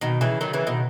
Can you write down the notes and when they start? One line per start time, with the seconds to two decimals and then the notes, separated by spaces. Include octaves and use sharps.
0.01 B2 D#3
0.21 C#3 E3
0.41 D#3 F#3
0.53 C#3 E3
0.67 B2 D#3